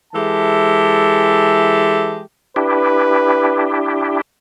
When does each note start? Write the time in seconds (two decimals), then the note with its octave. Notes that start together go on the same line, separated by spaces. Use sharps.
0.13 E3 G#3 G4 A4 E5 A5
2.56 D4 E4 G4 B4